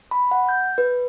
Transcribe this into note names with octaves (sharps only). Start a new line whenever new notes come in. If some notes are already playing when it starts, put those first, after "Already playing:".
B5
F#5
G6
B4